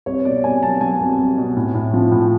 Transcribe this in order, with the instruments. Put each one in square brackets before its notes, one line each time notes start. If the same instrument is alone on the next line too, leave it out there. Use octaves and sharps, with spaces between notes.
[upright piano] C2 C#5
B2 D5
C2 G#5
F#3 A5
F#3 G#5
C2
C2
B2
A2
A2
F3
A2